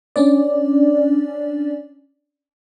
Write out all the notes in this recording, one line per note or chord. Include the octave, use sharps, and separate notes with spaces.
C#4 D4 D5